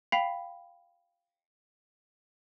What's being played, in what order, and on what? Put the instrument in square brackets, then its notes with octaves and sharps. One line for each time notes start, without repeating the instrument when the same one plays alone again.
[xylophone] F5 G5 B5 B6 C7 F7